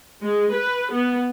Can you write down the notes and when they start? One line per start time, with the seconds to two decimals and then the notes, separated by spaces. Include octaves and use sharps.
0.21 G#3
0.52 B4
0.92 B3